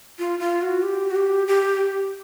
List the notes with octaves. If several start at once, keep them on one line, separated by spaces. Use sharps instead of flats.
F4
F4
F#4
G4
F#4
G4
G4